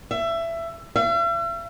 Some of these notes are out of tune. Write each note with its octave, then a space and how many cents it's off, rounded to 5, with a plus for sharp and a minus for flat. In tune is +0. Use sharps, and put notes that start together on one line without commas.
E5 +20
E5 +45